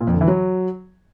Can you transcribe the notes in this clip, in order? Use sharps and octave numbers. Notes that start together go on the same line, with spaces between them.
A#2
F2
D3
E3
F#3